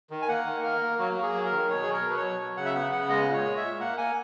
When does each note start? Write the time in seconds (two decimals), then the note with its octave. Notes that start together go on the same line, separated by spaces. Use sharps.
0.10 D#3
0.22 G#5
0.28 A#3 F#5
0.46 D#3
0.63 A#3 A#4
0.81 A#3
0.99 F#3 F#4
1.16 A#3
1.22 G#4
1.34 F#3
1.46 A#4
1.51 D#3
1.69 B2 C#5
1.83 F#3 G#4
1.93 A#4
2.04 B2
2.10 B4
2.17 F#3 C#5
2.39 F#3
2.57 C#3 F#5
2.66 E5
2.75 B3 F#5
2.92 C#3 F#5
3.09 G#3 D#5
3.27 A#2
3.33 C#5
3.45 G#3
3.57 E5
3.63 A#2
3.80 A#3 F#5
3.98 A#3 G#5